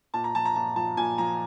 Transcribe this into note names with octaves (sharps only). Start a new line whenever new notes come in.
A#2 A5
A#5
F3 A5
A#5
A#2 A5
F3 A5
A#2 G#5
F3 A#5